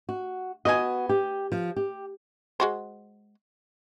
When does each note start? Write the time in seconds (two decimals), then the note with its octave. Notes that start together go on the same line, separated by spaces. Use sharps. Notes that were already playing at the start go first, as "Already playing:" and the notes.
0.09 F#4
0.65 B3 F#4 D#5 G#5
1.09 G4
1.52 F3
1.76 G4
2.60 G#3 F#4 C5